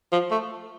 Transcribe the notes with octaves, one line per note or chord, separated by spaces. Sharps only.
F3
A3